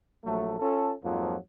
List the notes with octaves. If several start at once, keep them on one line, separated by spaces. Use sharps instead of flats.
A#1 F#3 A3
C#4 F4 A4
F2 G#2 F3 F#3 A#3